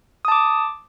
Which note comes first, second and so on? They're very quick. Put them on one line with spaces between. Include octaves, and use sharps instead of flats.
D#6 A5 D6